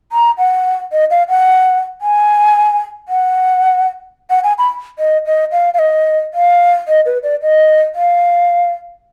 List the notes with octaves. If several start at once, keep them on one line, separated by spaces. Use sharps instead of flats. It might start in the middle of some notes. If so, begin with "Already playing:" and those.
A#5
F#5
D#5
F5
F#5
G#5
F#5
F#5
G#5
B5
D#5
D#5
F5
F5
D#5
F5
D#5
B4
D5
D#5
F5